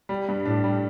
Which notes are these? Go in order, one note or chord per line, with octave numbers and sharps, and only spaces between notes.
G3
G2
A2 D4
G3